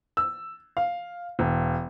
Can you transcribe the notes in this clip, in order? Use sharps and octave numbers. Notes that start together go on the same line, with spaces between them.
E6
F5
E1